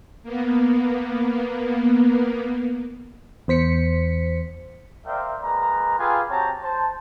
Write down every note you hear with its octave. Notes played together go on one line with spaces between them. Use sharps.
A#3 B3
E2 C5 B6 C#7
A#4 C5 D5 E5 F5 G5
G#3 A#3 B4 A#5
F4 G4 G#4 B4 F5 G#5
C4 F#4 G4 C#5 A5 A#5
C5 A5